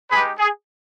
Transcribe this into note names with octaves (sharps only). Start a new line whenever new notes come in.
G#3 D#4 G4 G#4 B4
G#4